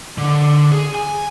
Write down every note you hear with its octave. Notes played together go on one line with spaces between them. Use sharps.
D3
G#4
G#5